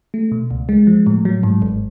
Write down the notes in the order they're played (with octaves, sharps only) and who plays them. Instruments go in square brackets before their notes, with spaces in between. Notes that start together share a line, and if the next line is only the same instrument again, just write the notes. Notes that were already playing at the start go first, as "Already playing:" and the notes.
[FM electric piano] A3
B2
C#2
G#3
F3
A2
F#3
G#2
G#1